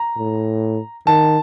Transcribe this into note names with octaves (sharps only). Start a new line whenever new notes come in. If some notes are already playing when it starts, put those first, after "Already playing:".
Already playing: A#5
A2
D#3 A5